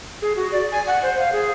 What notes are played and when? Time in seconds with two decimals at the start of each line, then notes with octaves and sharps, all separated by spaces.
0.22 G#4
0.36 F#4
0.52 D5
0.72 G#5
0.87 F#5
1.03 C5
1.19 F5
1.32 G#4